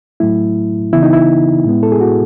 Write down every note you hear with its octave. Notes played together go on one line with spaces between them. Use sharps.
A2 F#3 A3 E4
C#3 E3 B3 E4
D#4
E4
A2 G#3 B3
A4
G#4
F#4